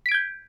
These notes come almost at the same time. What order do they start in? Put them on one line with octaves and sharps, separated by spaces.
B6 D7 G#6 G6